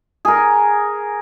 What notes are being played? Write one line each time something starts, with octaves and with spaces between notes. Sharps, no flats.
G#4 A#4